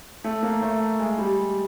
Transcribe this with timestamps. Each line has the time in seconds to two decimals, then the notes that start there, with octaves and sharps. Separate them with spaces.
0.24 A3
0.43 A#3
0.62 A3
0.99 G#3
1.18 G3